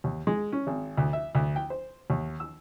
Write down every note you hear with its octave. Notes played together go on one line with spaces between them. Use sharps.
D#2
G#3
C#4
G#1
D2
E5
D2
G5
C5
D#2
E6